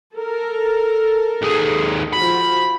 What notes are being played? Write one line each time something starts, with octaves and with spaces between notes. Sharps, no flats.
A4 A#4
D#2 G#4
F3 F#4 B5